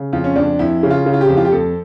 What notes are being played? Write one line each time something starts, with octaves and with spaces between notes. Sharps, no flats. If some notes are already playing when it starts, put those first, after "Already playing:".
Already playing: C#3
F2 F4
C#4
F2 D4
F2 E4
C#3
F4
C#3
F4
G4
F2
F4
G4
F2 A4